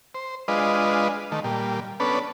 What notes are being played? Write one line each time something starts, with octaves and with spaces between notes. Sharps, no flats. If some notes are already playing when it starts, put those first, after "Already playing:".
C5
G#3 D4 F4 B4 D#5
D#3 A3
A#2 G3
B3 C#4 D4 A4 B4